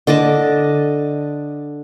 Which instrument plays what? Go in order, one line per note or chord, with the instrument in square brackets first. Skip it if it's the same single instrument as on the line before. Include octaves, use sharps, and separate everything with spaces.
[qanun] D3 D5 D#5 A5